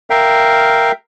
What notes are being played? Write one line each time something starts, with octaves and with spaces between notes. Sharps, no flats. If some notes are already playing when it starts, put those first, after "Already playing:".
A#4 E5 F5 G5